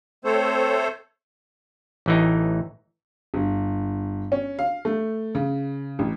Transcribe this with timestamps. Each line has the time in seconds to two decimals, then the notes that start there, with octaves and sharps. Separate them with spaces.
0.25 A3 C4 A4 C5 C#5
2.06 A1 E3 D#4
3.34 G1
4.32 C#4
4.59 F5
4.85 A3
5.35 C#3
5.99 A1